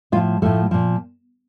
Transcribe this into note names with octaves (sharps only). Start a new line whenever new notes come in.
A2 F3 F4
A2 F3 A3
A#2 F3